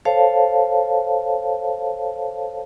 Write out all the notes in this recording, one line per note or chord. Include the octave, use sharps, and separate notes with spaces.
A4 C5 C#5 F5 A5